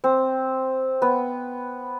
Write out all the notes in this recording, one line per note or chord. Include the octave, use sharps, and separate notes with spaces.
C4
B3